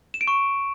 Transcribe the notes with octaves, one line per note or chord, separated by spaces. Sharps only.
E7
D7
C#6